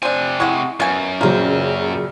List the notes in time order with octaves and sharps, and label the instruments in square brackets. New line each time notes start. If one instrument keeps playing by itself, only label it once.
[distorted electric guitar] C3 G#5 [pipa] C4 D4
[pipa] G#3 E4 F#5 [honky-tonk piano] C#6
[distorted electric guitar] F#2 [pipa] B2 G#5
[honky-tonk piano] A#2 C#3 F#3 [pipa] A#3 C4